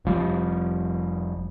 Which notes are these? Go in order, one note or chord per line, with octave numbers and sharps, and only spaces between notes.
F1 F3 G3